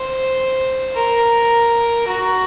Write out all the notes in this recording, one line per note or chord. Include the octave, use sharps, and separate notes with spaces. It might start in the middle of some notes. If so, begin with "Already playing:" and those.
Already playing: C5
A#4
F#4